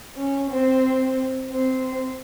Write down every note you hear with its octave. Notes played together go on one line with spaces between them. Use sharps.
C#4
C4
C4